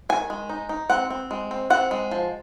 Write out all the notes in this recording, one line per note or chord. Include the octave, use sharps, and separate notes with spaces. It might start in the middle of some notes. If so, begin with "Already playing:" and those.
D#3 G#5
G#3
D#4
D#4
C4 F#5
C4
G#3
C4
C4 F#5
G#3
F3